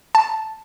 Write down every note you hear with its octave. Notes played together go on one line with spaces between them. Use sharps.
A5